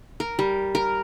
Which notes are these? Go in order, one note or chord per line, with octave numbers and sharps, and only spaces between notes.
A#4
G3
A#4